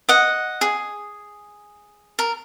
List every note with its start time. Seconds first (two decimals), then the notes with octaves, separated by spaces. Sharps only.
0.09 D#5 F#5
0.61 G#4
2.19 A#4